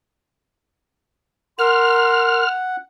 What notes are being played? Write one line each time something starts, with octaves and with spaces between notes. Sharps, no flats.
A#4 F#5 C6 F6